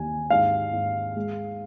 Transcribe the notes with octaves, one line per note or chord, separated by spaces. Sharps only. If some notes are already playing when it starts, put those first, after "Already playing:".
Already playing: D#2 G#5
G#2 F5
G#2
G#3